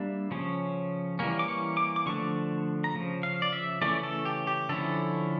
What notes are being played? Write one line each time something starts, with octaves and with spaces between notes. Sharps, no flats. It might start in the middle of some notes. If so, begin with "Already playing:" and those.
Already playing: G3 A#3 D4 E5
C#3 F3 C#4
E3 G3 A#3 C#4
D6
C#6
D6
D6
D3 F3 A3 D4 C#6
A#5
C#3 F3
F5
D5
E5
C#3 E3 A3 C#4 D5
A4
G4
G4
D3 F3 C#4 E4 A4